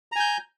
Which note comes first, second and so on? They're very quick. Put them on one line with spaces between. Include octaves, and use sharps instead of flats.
A#5 G#5 G6